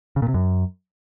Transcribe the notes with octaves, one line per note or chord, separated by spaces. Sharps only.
C#3
A#2
C3
F#2